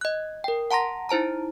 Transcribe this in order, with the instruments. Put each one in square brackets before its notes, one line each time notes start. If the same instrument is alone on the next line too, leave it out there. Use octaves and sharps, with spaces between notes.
[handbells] D#5 F#6
A#4 G5
F#5 A5 A#5 C6 A#6
D#4 E4 C5 A5 A#5